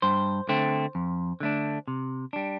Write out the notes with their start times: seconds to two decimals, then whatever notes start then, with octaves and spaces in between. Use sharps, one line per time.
0.02 G2 C5
0.49 D3 A3 C4
0.95 F2
1.40 D3 A3 D4
1.88 C3
2.33 G3 D4